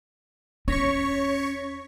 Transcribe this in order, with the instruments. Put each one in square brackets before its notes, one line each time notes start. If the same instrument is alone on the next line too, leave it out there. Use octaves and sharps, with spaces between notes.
[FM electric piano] E2 A#6 B6 [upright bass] C#4 [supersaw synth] C#5 C#6